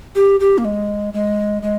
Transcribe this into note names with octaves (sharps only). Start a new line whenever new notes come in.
G4
G4
A#3
G#3
G#3
G#3